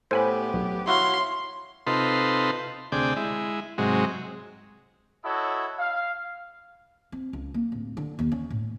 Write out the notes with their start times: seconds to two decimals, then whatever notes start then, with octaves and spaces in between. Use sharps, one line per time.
0.11 A2 B3 G4 C5 G#5 B5
0.54 B1
0.87 E4 F#4 C#5 F5 C6
1.87 C3 D#4 F4 A4 B4 C6
2.92 D2 C3 G#4 D5 G5
3.16 G#3 E4
3.78 G#2 C3 F#3 G#3
5.24 E4 F#4 A4 C#5 D#5
5.78 F5
7.12 C4
7.33 C#2
7.54 A#3
7.72 D1
7.97 D3
8.19 D#2
8.32 C#4
8.51 A2